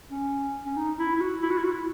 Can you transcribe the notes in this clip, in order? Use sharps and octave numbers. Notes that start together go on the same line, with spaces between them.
C#4
C#4
D#4
E4
E4
F#4
E4
F#4
E4
F#4
E4